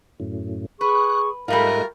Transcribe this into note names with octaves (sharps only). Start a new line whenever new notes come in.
F#2 A2
G#4 B4 C#6 F#6
G#2 G3 A3 F4 A4 A#4 D#5 F#6